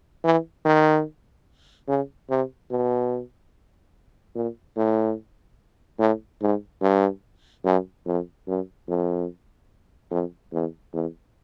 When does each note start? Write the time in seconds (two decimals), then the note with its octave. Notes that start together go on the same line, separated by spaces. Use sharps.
0.24 E3
0.65 D#3
1.88 C#3
2.30 C3
2.71 B2
4.35 A#2
4.77 A2
5.99 A2
6.42 G#2
6.82 G2
7.65 F#2
8.06 F2
8.47 F#2
8.89 F2
10.11 F2
10.53 E2
10.93 E2